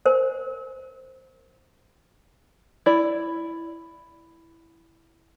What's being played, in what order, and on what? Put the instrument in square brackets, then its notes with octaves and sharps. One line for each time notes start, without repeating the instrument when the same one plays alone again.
[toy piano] A#4 C5 G#5
[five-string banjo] E4 D5